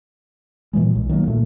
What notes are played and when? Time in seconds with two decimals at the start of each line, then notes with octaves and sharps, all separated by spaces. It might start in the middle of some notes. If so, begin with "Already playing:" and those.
0.73 A#2 E3 F#3 G#3
0.96 B1
1.09 D#3 F#3 G3 A#3
1.27 A#2 A3